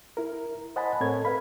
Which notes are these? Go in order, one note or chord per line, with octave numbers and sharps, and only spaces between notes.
E4 A#4
C5 D#5 F#5 G#5 A5 B5
A2 C4 A4 A#4 C#5 G#6
B4 F5 B5